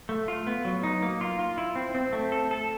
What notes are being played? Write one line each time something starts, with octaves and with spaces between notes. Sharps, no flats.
A3
F4
B3
F#3
D#4
A#3
F4
F4
E4
C4
C4
A3
A4
A4